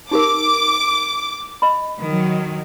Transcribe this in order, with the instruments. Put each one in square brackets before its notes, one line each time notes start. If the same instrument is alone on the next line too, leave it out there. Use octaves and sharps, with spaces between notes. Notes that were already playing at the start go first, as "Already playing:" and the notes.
[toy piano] D#4 G4 A#4 [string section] D6
[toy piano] D#5 B5
[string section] D#3 F#3